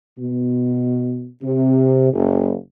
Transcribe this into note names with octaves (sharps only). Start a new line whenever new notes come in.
B2
C3
F#1